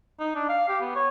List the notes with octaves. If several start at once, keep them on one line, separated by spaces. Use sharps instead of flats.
D#4
D4
F5
G4
B3
C#5